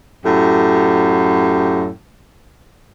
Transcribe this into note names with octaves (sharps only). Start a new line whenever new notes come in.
F#2 A2 G4